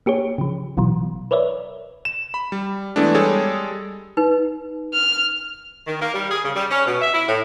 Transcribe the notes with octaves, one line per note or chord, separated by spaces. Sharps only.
A#3 G4 G#4 C#5
C#3 F3
A1 B2 E3 F#3
A#4 B4 C#5 D5 E5
E7
B5
G3
E3 G#3 A3 B3 D4
G3 G#3 G#4 A4 C#5
D#4 B4
F6
D#3
A#3
G3
G#4
C#3
G3
C#4
B2
E5
E4
A2